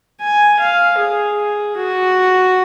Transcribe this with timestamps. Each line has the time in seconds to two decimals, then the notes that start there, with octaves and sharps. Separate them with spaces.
0.21 G#5
0.60 F5
0.98 G#4
1.76 F#4